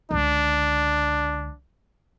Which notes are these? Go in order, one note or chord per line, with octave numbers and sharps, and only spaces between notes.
C#2 D3 D4